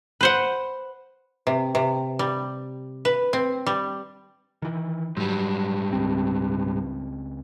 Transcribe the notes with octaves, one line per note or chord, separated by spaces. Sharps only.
B4 C5 F#5
C3
C3
G3
B4
C4
G3
D#3 E3
G#2 F#3 G3
C#2 C4